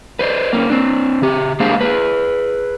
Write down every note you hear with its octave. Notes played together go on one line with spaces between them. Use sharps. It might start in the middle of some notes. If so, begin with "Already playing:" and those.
B4 C5 D5
A#3 C4 C#4
C4 D4
C#3 G4
G#3 A#3 D4 G#4 C5 F5
G#4 B4